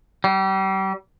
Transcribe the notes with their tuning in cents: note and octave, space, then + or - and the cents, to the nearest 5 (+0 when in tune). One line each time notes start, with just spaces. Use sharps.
G3 -35